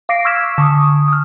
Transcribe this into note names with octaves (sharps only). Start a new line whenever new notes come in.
F5 D6 A#6 C7 D7
C#6 E6 F6 G#6 B6 E7
D3 C#6 D#6
D#6 F6